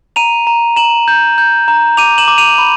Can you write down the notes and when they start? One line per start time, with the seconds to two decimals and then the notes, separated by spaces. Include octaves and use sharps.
0.16 A#5 D#7 F7
0.47 A#5
0.76 A#5 E7 F#7
1.08 G6
1.38 G6
1.68 A#5
1.97 D6 D#7 F7
2.18 E7 F#7
2.28 D6
2.38 D#7 F7
2.58 B5